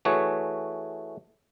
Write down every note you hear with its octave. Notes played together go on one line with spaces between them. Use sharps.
E3 A3 F#4 G#4 C#5